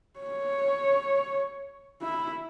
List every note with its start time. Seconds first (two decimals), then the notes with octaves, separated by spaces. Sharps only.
0.20 C#5
2.02 E4